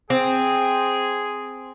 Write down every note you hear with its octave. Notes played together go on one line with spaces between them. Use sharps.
C4 G#4 G5